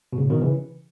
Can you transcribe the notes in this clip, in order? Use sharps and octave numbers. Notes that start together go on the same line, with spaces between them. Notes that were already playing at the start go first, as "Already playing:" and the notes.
B2
A2 C#3
B2 D#3
C#3 E3